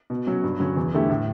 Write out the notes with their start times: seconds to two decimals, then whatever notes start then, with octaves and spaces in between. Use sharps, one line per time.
0.10 B2
0.27 F#3 C#4
0.43 G2
0.60 D3 F#3 C#4
0.77 E2
0.94 D3 A3 E4 G4
1.10 A2